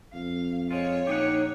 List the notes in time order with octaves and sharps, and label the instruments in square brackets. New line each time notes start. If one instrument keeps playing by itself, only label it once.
[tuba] F2 [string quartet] F5
[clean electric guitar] G#3 F4 [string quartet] C#5 [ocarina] F5
[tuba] A#1 [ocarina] D#4 [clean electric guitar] G4 G#4 F#5